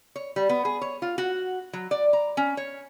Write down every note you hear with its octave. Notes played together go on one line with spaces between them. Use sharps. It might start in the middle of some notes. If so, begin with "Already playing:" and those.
C#5
G3
B3
G#4
C#5
F4
F#4
F#3
D5
A#5
C#4
C#5